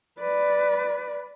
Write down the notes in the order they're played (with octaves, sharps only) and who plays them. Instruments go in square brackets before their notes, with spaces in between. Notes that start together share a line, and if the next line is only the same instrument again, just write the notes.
[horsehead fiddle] B4 D5